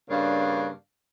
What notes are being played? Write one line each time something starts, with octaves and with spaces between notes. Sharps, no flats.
G2 C#3 A#3 D4 F5